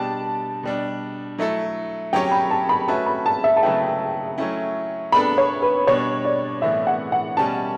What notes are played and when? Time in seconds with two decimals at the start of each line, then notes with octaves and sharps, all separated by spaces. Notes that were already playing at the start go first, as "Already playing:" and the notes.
Already playing: B2 G3 D4 G4 D5 A5
0.63 B2 G3 D4
1.38 F#3 A3 E4 A4
2.13 F#3 C#4 G4 C#5 G5
2.31 B5
2.51 A5
2.69 B5
2.88 A3 C#4 F#4 B4 E5 A5
3.06 B5
3.26 A5
3.44 E5
3.56 A5
3.63 C#3 F#3 A3 E4 B4 G5
4.38 F#3 A3 C#4 E4
5.12 B3 D4 A4 B5
5.38 C#5
5.62 B4
5.87 B2 G3 D4 C#5
6.25 D5
6.62 A2 E3 B3 E5
6.87 F#5
7.12 F#5
7.37 B2 G3 C#4 G4 C#5 A5